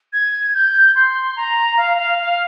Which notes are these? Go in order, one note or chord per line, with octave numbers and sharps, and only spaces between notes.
G#6
G6
C6
A#5
F5
F5
F5